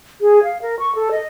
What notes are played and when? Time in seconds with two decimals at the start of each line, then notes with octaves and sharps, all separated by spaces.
0.21 G#4
0.43 F5
0.62 A#4
0.79 C#6
0.95 A4
1.11 D#5